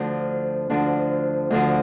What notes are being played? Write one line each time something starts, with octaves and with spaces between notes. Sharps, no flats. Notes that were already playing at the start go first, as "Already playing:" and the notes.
Already playing: D2 D3 F3 D4
D2 D3 F3 D4
D2 D3 F3 D4